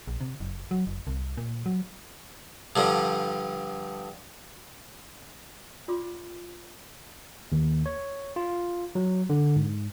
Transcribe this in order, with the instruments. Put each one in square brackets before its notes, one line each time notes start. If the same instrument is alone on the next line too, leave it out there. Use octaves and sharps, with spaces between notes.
[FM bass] A#1
C3
F#1
F#3
F#1
C2
A#2
F#3
[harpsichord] G2 D3 F3
[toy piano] F4 D5 C6 D6
[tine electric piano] D#2
C#5
F4
F#3
D3
G#2